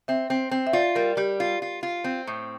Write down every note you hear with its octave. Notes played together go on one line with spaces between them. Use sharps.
C4 E5
C4
C4
E5
F4 D5
G3 A#4
G3 G4
F4
F4
F4
C4
A2